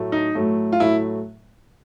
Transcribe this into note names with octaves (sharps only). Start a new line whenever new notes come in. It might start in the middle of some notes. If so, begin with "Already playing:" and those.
Already playing: A2 F#3 A3
D#4
A2 F#3 A3
F4
A2 F#3 A3 E4